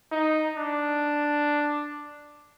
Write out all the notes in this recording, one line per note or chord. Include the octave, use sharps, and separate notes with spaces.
D#4
D4